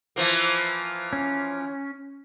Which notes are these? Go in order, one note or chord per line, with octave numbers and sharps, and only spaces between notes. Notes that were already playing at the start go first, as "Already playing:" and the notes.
E3 F3 A#3
C#4